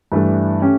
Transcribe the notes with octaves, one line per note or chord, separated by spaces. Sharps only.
G2 E3 A3 D4 A4
A3 C#4 G4